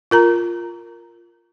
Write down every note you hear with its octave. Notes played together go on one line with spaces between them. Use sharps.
F4 A#4 A#5